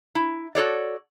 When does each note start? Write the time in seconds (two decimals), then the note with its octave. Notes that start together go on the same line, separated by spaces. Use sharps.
0.15 E4
0.55 F#4 A4 C#5 D5